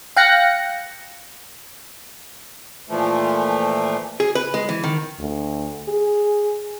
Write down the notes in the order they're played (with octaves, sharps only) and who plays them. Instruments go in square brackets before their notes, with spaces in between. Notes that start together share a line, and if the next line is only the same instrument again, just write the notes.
[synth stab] F5 G5 F#6 A#6 C#7
[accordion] A#2 E3 F3 A3
[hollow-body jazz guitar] G#4
B4
G#3
E3
D#3
[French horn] D2
G#4